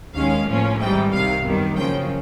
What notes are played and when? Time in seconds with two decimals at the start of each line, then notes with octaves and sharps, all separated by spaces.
0.13 D#2 D#3 G#3 C#4 F5
0.46 A2 F3 A#3 C#4
0.79 G#1 G#2 E3 G3 G5
1.12 C2 C3 D#3 F5
1.44 F#2 D#3 G3 B3
1.77 F#2 C#3 F3 A#3 G5